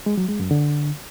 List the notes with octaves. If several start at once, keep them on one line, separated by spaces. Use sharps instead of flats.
G#3
F#3
G#3
F#2
D3